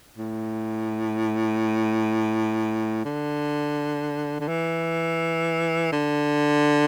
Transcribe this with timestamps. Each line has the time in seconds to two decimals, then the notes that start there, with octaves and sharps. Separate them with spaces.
0.18 A2
3.05 D3
4.40 D3
4.48 E3
5.92 D3